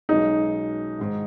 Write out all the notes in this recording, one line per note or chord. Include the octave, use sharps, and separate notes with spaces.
B1 B2 G#3 C#4 D#4 G#4
G#2 D#3 G#3